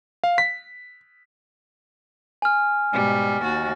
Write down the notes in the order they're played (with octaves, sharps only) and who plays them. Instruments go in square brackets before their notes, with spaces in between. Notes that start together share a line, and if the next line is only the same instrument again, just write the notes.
[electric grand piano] F5
B6
[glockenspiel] G#5 F6
[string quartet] G#2 B2 G3
D#2 F#4 A6